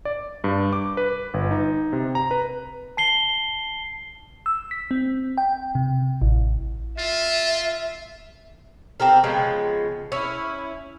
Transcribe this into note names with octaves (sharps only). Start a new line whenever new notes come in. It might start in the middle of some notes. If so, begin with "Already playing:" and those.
D5
G2
D6
B4
G1
D#4
C3
A#5
B4
A5 C7 G7
E6
B6
C4
G5
C3
A1
F4 E5
C4 G4 A4 A#4
C#3 F3 G#3 B3
C#4 E4